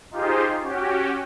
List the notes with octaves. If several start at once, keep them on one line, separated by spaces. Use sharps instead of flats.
D#4 F4 G4 G#4 C5
C#4 F#4 G4